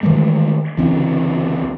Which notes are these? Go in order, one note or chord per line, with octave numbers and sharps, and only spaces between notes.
D#3 E3 G#3 A3
C#2 D3 E3 C4